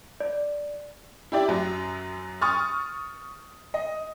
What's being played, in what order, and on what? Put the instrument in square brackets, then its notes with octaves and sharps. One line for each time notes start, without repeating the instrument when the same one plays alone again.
[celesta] D5
[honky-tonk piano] E4 G4 D5
F#2 F#3
C#6 D#6 F6 A6
D#5